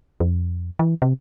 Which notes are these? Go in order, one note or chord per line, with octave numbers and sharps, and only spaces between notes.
F2
E3
C3